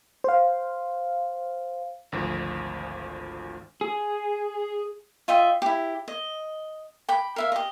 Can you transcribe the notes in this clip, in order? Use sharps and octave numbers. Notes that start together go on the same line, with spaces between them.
C5 F5
G#1 D2 F3
G#4
F4 D#5 E5 G5
E4 G4
D#5
G5 B5 D6
A#4 E5 F5
G4 D#5